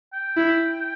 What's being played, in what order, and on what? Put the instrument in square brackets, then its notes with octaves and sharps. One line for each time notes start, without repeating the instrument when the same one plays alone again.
[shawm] G5
[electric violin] E4